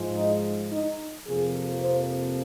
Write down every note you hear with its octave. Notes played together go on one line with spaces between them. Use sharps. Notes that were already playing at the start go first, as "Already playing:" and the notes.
Already playing: G#2 F3 G#3
D#4
D#4
F2 C3 F3 A#3 G#4
C5